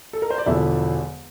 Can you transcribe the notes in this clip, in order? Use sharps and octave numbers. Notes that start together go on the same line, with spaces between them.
A4
A#4
C5
D5
E1 E2 D3 F3 E4 E5